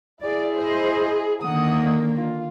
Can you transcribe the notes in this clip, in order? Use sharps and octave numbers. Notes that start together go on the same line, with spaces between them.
E4 G#4 D5
C5 D#5
D3 D#3 A#3 F#5 D#6
F4